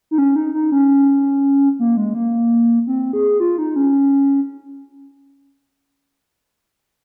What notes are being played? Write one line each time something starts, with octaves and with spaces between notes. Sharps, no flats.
D#4
C#4
D#4
D#4
C#4
A#3
G#3
A#3
C4
G#4
F4
D#4
C#4